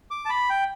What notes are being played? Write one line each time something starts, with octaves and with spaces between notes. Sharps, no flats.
D6
A5
B5
G5